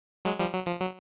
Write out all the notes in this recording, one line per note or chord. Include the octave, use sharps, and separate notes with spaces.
F#3 G#3
F3 G3
F#3
F3
F#3